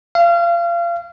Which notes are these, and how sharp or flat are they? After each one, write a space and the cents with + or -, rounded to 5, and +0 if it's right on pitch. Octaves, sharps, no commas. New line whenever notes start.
F5 -30